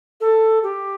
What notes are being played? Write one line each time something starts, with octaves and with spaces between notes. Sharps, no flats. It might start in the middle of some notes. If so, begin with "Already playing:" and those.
A4
G4